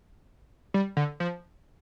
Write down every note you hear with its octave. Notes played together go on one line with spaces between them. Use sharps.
G3
D3
F3